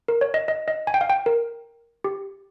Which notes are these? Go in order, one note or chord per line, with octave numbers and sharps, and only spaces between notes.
A#4
C#5
D#5
D#5
D#5
G#5
G5
F5
G5
A#4
G4